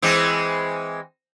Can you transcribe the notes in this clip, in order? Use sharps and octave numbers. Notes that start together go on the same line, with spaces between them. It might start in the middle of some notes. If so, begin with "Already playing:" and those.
E3 G#3 C4